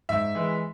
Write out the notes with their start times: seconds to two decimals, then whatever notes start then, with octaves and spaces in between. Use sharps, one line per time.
0.09 G#2 E5
0.35 E3 G#3